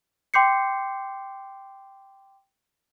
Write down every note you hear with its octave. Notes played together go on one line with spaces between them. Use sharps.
G5 C6 D6 G6 C7 C#7